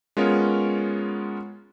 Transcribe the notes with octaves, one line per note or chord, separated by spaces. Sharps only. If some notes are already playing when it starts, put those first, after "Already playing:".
G#3 B3 C#4 F4 A#4 C#5